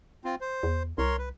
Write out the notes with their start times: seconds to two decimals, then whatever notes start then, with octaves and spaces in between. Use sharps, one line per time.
0.25 C4 F4
0.41 C5
0.63 E2
0.98 C2 A#4 C#5 C6
1.19 B4